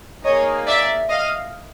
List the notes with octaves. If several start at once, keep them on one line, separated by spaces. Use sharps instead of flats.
A#3 D#4 G#4 C#5 D#5
D5 E5
D#5 F5